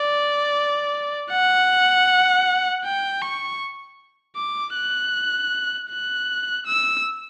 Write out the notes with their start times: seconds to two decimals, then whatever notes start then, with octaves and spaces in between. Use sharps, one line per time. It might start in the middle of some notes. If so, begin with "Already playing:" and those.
Already playing: D5
1.32 F#5
2.84 G5
3.22 C#6
4.37 D6
4.75 F#6
5.90 F#6
6.66 E6